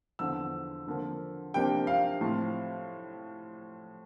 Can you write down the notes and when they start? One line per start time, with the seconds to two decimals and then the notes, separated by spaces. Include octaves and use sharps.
0.19 E2 D3 F3 E6
0.87 D3 F3 A#3
1.54 C3 F3 A#3 D4 G5
1.87 F5
2.21 A2 F3 C4